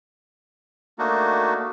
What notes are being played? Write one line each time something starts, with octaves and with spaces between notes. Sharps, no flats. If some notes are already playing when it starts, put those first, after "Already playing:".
A3 A#3 D4 D#4 F#4